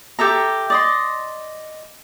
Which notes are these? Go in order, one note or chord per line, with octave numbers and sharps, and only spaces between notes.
G4 A4 E5 A#5
D5 D#5 C6